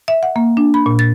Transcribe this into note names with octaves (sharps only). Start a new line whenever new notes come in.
E5
F#5
A#3
D4
B5
A#2
A6